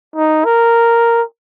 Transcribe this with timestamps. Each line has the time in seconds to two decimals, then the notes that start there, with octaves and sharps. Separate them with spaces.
0.16 D#4
0.45 A#4